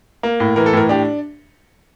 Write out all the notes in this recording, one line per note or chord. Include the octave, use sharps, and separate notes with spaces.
A#3
A2
E3 A#4
A4
A2 A#4
D4 G4